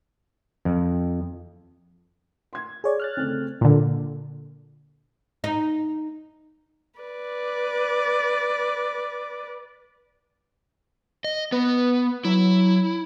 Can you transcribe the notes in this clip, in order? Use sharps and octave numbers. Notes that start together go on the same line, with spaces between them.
F2
C6 G#6
G#4 C#5 D5
F6 F#6 A6
C#3 A3 C4
A#2 D3
D#4
B4 D5
D#5
B3 B4
F#3 E4